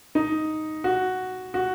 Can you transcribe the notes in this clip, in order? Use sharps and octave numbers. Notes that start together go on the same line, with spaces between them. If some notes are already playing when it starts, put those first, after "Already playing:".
D#4
F#4
F#4